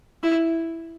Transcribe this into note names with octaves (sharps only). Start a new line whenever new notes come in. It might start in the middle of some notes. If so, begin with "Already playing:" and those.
E4